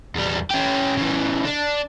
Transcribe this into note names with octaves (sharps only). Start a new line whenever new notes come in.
E2 G3
C#4 G4
C#3 E3
D4